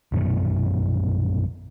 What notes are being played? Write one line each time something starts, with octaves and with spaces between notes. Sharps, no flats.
A#1 F#2 B2 A3